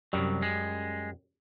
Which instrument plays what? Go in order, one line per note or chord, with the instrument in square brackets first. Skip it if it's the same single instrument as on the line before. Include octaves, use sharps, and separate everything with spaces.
[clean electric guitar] C2 F#3 [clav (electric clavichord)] F#2 G3
[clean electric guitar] G#3